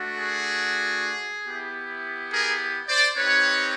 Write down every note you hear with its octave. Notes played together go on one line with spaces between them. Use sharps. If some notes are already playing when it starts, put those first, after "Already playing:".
Already playing: A3 D4 F#4
G#4
B3 E4 G4
G#4 A#4
C5 D5
C4 D#4 G4 B4 C#5